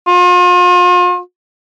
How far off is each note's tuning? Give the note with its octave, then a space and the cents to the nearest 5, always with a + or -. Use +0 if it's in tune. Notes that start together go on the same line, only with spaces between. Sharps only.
F4 +40